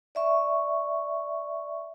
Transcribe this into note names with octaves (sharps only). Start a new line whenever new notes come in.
D5 E5 C#6